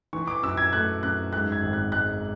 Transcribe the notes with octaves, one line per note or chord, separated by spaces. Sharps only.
E3 C#6
D6
F#2 E6
G#6
A3 F#6
F#2 F#6
G#2 F#6
G#6
G#1
F#6
G#3 F#6